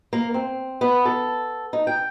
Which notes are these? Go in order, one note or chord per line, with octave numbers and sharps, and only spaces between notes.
A#3
C4
B3
A4
D#4
G5